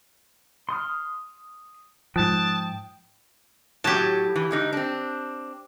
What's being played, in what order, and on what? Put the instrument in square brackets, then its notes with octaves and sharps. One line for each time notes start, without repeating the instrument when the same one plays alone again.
[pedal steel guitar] C6 D#6 F6
[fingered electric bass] G#2 F3 [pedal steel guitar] G5 D#6 F#6 [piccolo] A5
[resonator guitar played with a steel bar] A2 F#3 [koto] G4 A5
[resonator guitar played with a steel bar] E3
G#2 D3 D#4
C4 D4